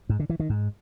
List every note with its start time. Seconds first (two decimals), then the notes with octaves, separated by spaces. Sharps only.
0.10 G#2
0.20 D3
0.30 E3
0.40 D#3
0.50 G#2